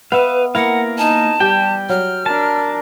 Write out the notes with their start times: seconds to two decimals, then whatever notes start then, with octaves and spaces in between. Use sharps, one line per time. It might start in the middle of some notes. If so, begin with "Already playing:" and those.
0.12 B3 B4 E5 F5
0.55 A#3 E4 A#4 F5 F#5
0.98 D#4 G#5 A5
1.40 G3 G4 G5
1.89 F#3 F6
2.26 D4 A#4 A5